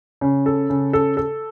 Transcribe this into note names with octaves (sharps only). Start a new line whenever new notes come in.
C#3
A4
C#3
A4
A4